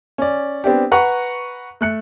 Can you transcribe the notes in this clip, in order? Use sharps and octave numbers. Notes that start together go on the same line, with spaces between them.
C#4 D5
B3 C4 D4 G4
B4 F#5 A#5 C#6
A3 F#6 C#7